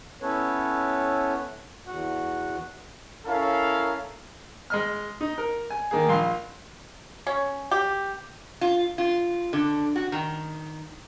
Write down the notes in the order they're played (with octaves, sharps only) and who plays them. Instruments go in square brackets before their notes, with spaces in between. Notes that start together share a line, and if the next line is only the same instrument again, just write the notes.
[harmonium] B3 C#4 E4 A4 B4 C#5
E2 F#4 F#5
[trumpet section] C#4 E4 A4 A#4 F5
[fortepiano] G#3 D#5 F6
D#4
A#4
G#5
D#3 A#3 G#4
A#1 F5 C6
[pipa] C#4
G4
[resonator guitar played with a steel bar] F4
F4
D3
F#4
D#3